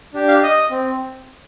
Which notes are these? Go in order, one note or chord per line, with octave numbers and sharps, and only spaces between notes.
D4 G4
F5
D#5
C4